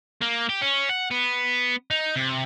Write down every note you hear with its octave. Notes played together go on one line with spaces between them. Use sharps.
A#3
G4
C#4
F#5
B3
D#4
C3